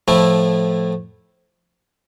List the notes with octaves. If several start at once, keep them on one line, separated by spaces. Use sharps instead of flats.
A2 F3 A3 E4